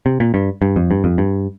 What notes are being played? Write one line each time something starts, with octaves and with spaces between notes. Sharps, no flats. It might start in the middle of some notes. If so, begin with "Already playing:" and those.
C3
A#2
G2
G2
F2
G2
F2
G2